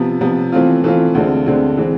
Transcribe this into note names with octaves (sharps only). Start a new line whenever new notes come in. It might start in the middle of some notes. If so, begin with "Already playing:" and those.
Already playing: C3 F3 B3
C3 F3 B3
E3 A3 C4 F4
E3 A3 C4 F4
D2 D3 G#3 C4
D2 D3 G#3 C4
E3 G#3 C4